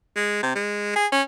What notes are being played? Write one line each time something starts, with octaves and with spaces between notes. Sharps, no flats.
G#3
C3
G#3
G#4
C#4